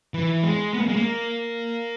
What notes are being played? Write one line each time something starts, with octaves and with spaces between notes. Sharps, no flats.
E3
G#3
B3
A#3
G#3
A#3